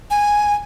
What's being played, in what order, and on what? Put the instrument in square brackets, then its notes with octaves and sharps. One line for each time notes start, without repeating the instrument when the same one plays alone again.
[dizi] G#5